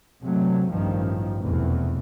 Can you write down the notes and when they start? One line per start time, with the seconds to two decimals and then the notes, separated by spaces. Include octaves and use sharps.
0.23 C3 F#3 A3
0.71 A1 G2 D#3 F3
1.39 F1 E2 B2